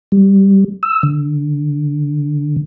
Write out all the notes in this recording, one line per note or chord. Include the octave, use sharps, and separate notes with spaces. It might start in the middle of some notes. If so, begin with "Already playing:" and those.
G3
E6
D3